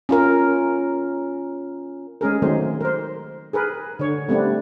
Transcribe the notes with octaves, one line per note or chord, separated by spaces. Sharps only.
C#4 F4 A#4
G#3 C#4 G#4 A#4
D#3 F#3 G#3 A3 C4 C5
A#4 C5
G#4 A#4 B4
D3 C#5
G3 A3 B3 C4 D4